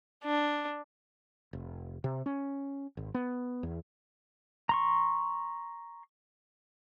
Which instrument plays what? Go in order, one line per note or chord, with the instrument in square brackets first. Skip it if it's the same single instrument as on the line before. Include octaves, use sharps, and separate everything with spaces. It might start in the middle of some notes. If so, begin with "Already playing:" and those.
[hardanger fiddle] D4
[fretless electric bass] F1
C3
C#4
G#1
B3
E2
[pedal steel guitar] A#5 C6 C#6